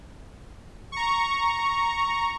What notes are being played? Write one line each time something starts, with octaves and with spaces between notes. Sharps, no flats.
A#5 C#6